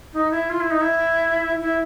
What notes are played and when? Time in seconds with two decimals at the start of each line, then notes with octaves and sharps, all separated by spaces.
0.13 D#4
0.30 E4
0.49 F4
0.60 E4
0.70 D#4
0.81 E4
1.60 E4